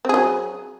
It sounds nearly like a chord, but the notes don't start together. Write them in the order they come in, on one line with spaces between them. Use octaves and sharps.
C4 G#4 F#3